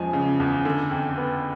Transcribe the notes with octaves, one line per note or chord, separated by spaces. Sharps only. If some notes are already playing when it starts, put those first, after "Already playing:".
Already playing: E2 C#3 F3 G#3 G#5
C#3
E2
D3
F2
B3